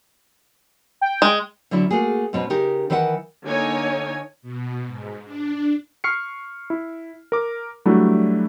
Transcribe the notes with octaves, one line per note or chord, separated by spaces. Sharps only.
G5
G#3
D3 F#3 C#4 E4
A3 A#3 F#4 G#4
G#2 B2 C#4 B4
C#3 D#4 G4 A#4
D#3 E3 B4 C5 F#5
D3 A#3 D#4 C#5 G#5
B2
G#2
D4
C#6 F6 C7 C#7
E4
A#4 D6
F#3 G3 A3 D4 E4 F#4